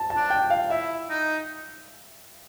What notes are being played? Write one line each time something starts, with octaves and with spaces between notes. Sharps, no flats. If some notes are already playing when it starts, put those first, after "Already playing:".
Already playing: A5
A5
D4
G5
F5
E4 E5
D#4